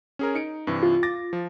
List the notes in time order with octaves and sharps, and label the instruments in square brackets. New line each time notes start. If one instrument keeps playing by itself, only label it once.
[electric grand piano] C#4 G#4 A#4
D#4 C#7 D7
G2 C3 E3
[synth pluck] F4
[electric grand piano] D6 A6 A#6
F3